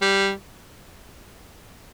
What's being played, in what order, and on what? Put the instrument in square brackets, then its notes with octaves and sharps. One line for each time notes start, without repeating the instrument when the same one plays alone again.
[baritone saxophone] G3